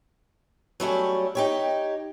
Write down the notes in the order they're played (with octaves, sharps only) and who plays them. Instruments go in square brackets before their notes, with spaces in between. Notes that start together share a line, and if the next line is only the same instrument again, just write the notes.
[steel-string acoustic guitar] F#3 G3 A3 C#4
D#4 G4 C#5